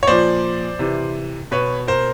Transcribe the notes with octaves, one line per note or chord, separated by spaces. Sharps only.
C#5
A#2 F3 C5 D5
C3 E3
B2 B4 C#5
A#4 C5